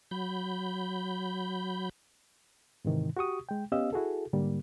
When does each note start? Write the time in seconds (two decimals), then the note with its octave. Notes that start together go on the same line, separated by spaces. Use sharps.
0.11 F#3 B5 G6
2.85 G#2 C3 D#3 E3
3.17 F#4 G4 C#6 D#6
3.49 G#3 G5
3.72 B3 C#4 G4 D#5 F5 E6
3.93 E4 F#4 G#4 A4
4.33 G#2 D3 G3 A#3